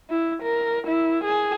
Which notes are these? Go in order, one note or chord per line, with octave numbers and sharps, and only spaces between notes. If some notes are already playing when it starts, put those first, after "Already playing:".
E4
A#4
E4
G#4